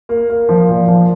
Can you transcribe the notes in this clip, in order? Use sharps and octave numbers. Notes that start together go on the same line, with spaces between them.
A#3
A#3
F3
A#2
F3